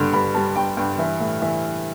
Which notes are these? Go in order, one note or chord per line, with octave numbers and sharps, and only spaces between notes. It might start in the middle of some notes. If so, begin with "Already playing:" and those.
Already playing: G2 D3 G3
G2 B5
G3 A5
G2 G5
G2 G5
E3 E5
A2
E3 E5